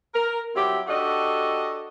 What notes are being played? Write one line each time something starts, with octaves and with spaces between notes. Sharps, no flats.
A#4
F#3 C4 E4 G4
D4 F#4 G4 A4 D#5